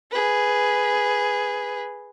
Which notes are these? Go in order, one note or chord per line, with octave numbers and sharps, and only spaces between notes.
G#4 B4